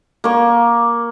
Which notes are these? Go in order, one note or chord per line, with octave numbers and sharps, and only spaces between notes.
A#3 C#6